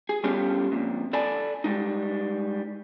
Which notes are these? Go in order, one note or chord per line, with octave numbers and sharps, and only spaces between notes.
G#4
G3 B3 C#4 F4 G4 A4
F2 A#2
A4 D5 G#5 A5 B5
G3 G#3 D#4